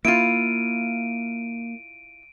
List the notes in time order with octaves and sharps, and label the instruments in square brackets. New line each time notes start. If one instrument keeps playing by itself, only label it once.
[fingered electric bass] A#3 [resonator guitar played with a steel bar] E4 F4 [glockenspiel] D7 D#7